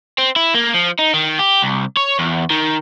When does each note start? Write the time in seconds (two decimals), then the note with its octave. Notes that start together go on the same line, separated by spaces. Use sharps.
0.18 C4
0.36 E4
0.54 A#3
0.74 F3
0.99 D#4
1.14 D#3
1.39 G4
1.62 C2
1.97 C#5
2.19 E2
2.50 D#3